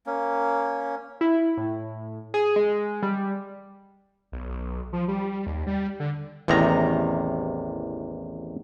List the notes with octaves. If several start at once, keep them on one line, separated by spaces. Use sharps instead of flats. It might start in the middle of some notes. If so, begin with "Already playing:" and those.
A#3 C#4
E4
A2
G#4
G#3
G3
B1
F3
G3
D#2
G3
D3
A1 E2 C3 D#3 A#5